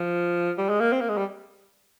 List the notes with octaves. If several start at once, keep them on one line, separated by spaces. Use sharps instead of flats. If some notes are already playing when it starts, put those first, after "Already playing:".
Already playing: F3
G3
G#3
A#3
C4
A#3
G#3
G3